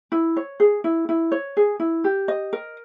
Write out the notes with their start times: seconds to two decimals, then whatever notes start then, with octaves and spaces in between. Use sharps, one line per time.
0.12 E4
0.36 C#5
0.60 G#4
0.84 E4
1.09 E4
1.32 C#5
1.57 G#4
1.80 E4
2.04 G4
2.28 D#5
2.53 A#4